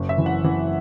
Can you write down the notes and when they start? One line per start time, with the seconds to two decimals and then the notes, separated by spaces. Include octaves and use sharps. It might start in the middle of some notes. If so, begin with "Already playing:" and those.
Already playing: F#1
0.09 E5
0.18 E3
0.26 F#5
0.44 E3